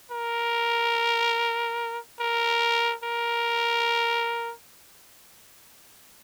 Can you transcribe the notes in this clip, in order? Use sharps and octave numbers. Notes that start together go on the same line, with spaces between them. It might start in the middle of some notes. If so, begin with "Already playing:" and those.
A#4
A#4
A#4